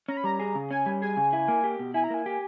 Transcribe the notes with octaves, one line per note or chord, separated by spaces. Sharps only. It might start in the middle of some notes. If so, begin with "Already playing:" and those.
C#4 A#5
B5
G3 A#5
G#4
C#3
C#4 G#5
G3
G#4 G#5
C#3
E4
A#3
G4
B2
E4 G#5
A#5
A#3 G#5
G4